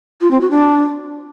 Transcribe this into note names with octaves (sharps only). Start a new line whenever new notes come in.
F4
C4
F#4
D4